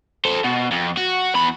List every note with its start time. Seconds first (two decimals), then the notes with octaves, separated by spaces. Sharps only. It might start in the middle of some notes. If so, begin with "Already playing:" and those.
0.25 A4 C5
0.44 B2
0.71 F2
0.97 F#4
1.35 E2 B5